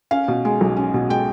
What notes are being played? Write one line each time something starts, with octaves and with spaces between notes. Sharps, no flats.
C#4 F5
B2
G#3
B1
C#4
B2
G#3 G5